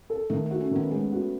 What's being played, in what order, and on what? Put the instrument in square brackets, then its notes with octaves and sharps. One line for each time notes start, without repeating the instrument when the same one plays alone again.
[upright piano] A4
[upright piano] D#3 [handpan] A3
[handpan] A3
[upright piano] F#4
[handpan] C#4
[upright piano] D#3 [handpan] B3
[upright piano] G#3 [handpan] A3
[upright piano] F#4